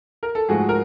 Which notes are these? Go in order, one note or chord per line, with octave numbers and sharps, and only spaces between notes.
A#4
A4
G#2 F3 A3 F#4 G#4
A#4